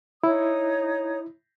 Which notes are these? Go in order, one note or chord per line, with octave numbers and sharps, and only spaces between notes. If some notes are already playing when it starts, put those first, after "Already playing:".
D#4 E4 C#5 D#6